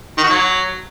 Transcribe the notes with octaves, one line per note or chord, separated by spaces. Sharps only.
D#3
F#4
F#3